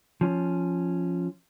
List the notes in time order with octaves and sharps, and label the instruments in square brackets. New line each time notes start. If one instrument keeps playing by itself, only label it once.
[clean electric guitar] F3 C#4